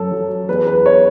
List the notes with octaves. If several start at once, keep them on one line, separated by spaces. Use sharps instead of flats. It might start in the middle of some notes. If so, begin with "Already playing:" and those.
Already playing: F#2 A4
F#3
E2 B4
B4
C#5